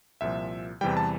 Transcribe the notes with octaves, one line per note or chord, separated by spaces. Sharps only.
C2 A#2 F3 E5
E2 C3 E3 G3 G5
A5